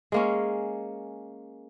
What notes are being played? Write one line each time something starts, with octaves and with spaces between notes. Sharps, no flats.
G#3 A#3 C#4